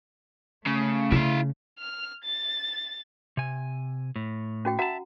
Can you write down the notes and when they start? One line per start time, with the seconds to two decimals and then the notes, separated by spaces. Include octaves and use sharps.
0.66 C#3 A3
1.12 C#3 E4 F5
1.79 F6
2.24 A6
3.37 C3 G#5
4.16 A2
4.65 C#4 F#4 G5
4.79 F#4 E5 F#5 A5 A#5